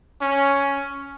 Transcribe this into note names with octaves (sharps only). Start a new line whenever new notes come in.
C#4